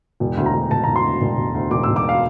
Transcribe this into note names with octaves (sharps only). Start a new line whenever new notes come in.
E1
D2
A#5
D2
E1 A5
E1 A#5
C6
D2
E1
E1
D2
E1 D6
E1 E6
D6
F5